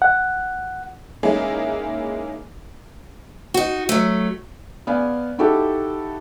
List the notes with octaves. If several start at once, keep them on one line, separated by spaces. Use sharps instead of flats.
F#5
G#3 A#3 C#4 D#4 E4 G#4
D#4 F#4
F#3 A3
B3 D5 F5 G#5
D#4 E4 F#4 G4 A4